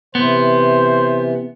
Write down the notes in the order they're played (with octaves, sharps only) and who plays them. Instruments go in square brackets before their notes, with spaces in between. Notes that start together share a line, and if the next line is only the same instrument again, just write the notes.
[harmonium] C3 E3 [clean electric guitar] B3 [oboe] C5